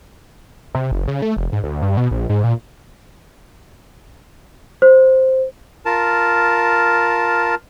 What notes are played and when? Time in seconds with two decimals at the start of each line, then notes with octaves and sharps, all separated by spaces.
0.75 C3
0.91 F#1
1.08 C#3
1.22 A3
1.37 F1
1.52 G#2
1.64 D2
1.82 G2
1.97 B2
2.11 A#1
2.30 G#2
2.44 A#2
4.82 C5
5.86 F4 A#4 A5